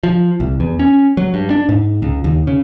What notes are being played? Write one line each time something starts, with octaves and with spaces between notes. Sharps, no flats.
F3
C2
E2
C#4
F#3
G2
D4
G#2
C#2
D#2
C#3